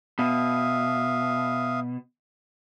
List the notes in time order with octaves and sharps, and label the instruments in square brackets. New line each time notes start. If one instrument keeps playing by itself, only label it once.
[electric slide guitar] B2 [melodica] E5 F5 D#6